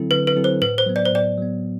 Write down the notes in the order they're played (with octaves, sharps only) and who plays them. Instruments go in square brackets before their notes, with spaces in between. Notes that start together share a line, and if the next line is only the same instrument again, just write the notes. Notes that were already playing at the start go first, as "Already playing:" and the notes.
Already playing: [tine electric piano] D3 F#3 C4 E4 A4
[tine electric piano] D3 [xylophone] B4
[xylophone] B4
[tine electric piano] F#3 C4 E4 A4
[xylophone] C5
[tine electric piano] A2 [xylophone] B4
[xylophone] C5
[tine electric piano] F#3 B3
[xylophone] D5
C5
[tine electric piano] A2 [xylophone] D5
[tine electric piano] F#3 B3